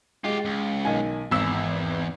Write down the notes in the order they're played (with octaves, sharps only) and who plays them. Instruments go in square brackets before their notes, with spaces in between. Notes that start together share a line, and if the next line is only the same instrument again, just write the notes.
[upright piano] G#3 [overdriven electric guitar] F4 G4
[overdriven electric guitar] C#2
[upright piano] B1 D#3 G#5
[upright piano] G#1 E6 [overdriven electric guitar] E2